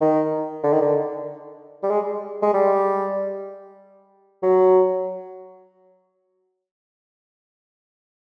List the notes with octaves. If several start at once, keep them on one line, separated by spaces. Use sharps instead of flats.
D#3
D3
D#3
D3
G3
G#3
G#3
G3
F#3